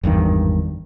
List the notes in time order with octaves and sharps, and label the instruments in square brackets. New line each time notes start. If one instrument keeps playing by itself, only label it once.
[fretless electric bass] G#1 E2 G2 D#3